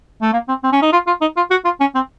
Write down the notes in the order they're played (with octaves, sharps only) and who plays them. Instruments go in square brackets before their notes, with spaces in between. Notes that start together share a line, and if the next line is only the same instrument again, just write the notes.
[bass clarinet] A3
A#3
C4
C4
C#4
D#4
F4
F4
D#4
F4
F#4
F4
C#4
C4